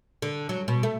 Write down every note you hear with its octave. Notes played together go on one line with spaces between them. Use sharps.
D3
F#3
B2
A3